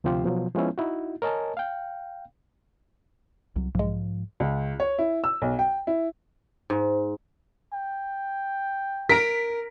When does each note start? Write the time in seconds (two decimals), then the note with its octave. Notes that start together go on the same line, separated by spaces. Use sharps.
0.04 D2 C3 F3 F4 G4 C5
0.24 B2 F3 F#3
0.55 F3 G#3 B3 C#4 E4
0.78 D#4 E4 F#4
1.22 A#4 C#5 D#5 G#5 A5
1.57 F5 G5
3.56 C2 F#3
3.75 B1 G#2 F3 G#3
4.40 C#2
4.80 C#5
4.98 E4
5.24 E6
5.42 B1
5.59 G5
5.87 E4
6.70 G#2
7.73 G5
9.09 A#4 B6 D7